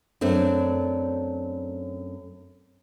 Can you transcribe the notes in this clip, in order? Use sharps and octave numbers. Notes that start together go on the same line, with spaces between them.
F#2 A3 C4 D4